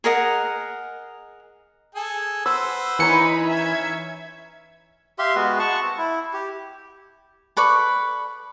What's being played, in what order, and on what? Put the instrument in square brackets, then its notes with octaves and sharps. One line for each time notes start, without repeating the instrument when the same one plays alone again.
[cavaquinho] G#4 A#4 D#5 F#5
[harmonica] G#4 A4 G#5
[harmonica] B4 C5 F#5 [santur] E6
[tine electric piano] E3 C#7 [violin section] D#4 E4 B5 [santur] C#5 G#5 A#5
[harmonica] C#4 [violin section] E5 G#6
[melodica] G4 E5 F5 C6
G#3 B3 F#4 B4
F#5 A5 C#6
C4
E4
G4
[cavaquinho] A4 B4 D5 C#6